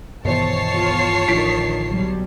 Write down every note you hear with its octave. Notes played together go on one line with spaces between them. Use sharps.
B1 G2 D#3 E3 C5 C#5 A5 C7
B3 F4
A1 D3 D#3 F3 B6 D7
B1 F#3 G3